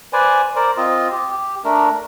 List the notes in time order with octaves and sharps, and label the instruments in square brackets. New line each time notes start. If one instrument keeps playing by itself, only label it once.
[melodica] B4 C5 D5 G#5
A#4 C5 D5
C4 F4 D#5
G4
G4
A3 D4 A#4